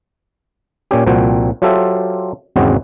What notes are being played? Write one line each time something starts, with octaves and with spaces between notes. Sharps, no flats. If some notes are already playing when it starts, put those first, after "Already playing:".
A#2 C#4 G4
C2 A#2 F3 C4 F#4 G5
F#3 F4 G4 A4 C5 E5
G#1 E2 C#3 C4 F#4 D#5